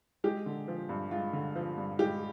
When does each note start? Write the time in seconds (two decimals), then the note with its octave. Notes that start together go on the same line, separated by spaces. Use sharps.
0.24 G#3 G4
0.46 D3
0.68 F3
0.89 G2
1.11 G#3 F4
1.33 D3
1.56 F3
1.77 G2
1.99 G#3 G4